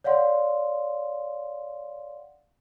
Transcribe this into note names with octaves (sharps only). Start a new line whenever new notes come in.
C#5 D5 F5 F#5 C6